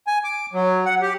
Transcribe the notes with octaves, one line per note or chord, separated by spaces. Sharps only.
G#5
D6
F#3
F#5
G4